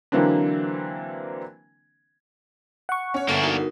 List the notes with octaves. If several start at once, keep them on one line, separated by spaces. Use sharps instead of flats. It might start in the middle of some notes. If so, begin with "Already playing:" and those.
D3 E3 F#3 A#3 C4 D4
F#5 C#6
C#4 C#5
G1 A#3 D4 E5 G#5 A#5
D#4 F#4 A#4